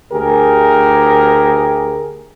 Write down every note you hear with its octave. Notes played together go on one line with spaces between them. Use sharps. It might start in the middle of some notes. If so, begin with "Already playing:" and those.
D2 G4 G#4 A#4